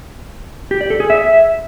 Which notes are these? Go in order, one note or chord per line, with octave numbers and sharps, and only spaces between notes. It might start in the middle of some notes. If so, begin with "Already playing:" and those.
G4
D5
A4
G#4
E5